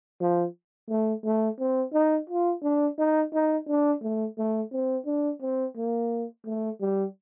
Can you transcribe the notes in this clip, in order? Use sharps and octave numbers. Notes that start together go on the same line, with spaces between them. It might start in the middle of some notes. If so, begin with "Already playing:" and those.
F3
A3
A3
C4
D#4
F4
D4
D#4
D#4
D4
A3
A3
C4
D4
C4
A#3
A3
G3